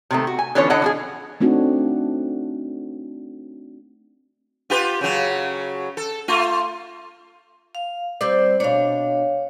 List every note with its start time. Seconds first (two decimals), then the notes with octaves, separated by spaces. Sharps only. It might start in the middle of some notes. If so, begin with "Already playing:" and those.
0.11 C3 D#3 A3
0.27 F#4
0.39 G#5
0.55 D3 E3 F3 B3 C#4 C#5
0.70 D3 D4 E4 D#5 F#5
0.82 F3 F#4 G#4
1.40 A3 C4 D4 D#4 F#4
4.70 F4 G4 B4
5.01 C#3 F#3
5.97 A4
6.28 A3 F4
7.75 F5
8.21 G3 C4 C5 D5
8.60 B2 D4 C#5 F5